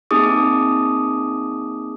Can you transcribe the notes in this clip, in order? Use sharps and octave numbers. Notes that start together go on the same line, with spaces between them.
A#3 C4 D#4 G#4 D6 D#6